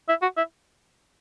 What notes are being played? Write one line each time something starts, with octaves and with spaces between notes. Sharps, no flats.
E4
F#4
E4